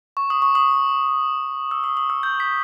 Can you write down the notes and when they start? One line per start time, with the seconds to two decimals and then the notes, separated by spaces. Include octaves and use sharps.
0.17 C#6
0.30 D#6
0.42 C#6
0.55 D#6
1.71 E6
1.84 D#6
1.97 D#6
2.10 E6
2.23 G6
2.40 B6